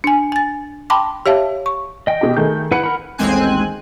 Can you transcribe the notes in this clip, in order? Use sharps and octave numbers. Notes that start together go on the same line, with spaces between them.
D4 G#5
G#5 A6
G5 A5 B5 C6 D6
G4 C#5 E5 F5 A5
C#6
D#5 G5
B2 G4
D#3 A3 G#4 G6
E4 B4 F#5 C#7
A#4 B5
A1 D#2 G#3 C4 G#5 F#6